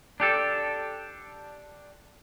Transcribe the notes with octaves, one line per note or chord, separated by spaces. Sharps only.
D4 G4 A4